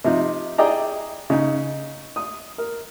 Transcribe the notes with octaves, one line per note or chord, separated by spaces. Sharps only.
C3 F3 D#4
E4 G#4 D5 D#5 G5 A#5
C#3 D#4
D#6
A#4